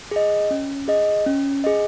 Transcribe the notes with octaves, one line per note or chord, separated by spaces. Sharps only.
G#4 D#5
C#4
G#4 D#5
C#4
G#4 D#5